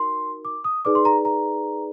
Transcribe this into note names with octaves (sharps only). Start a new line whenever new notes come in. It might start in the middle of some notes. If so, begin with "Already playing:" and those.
Already playing: D#4 F#4 A#4 C6
D6
D#6
D#4 G#4 B4 D5 D6
C6
A#5
A#5